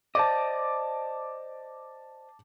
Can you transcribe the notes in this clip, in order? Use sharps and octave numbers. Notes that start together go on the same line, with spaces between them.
C5 D5 D#5 A5 D6